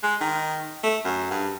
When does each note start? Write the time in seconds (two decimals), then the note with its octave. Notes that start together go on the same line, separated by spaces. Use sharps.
0.03 G#3
0.21 D#3
0.83 A3
1.04 F#2
1.31 G2